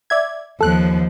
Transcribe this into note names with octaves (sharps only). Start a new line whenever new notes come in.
D5 E5 G#6
D#2 F3 A4 F#6